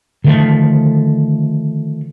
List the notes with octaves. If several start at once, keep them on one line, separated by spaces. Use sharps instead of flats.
D3 D#3 F3 A3